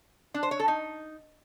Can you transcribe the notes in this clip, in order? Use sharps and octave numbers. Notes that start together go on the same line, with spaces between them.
D4
C5
C#5
A4
D#4